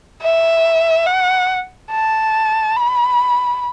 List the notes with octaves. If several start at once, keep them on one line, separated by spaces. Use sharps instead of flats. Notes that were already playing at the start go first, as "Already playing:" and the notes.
E5
F#5
A5
B5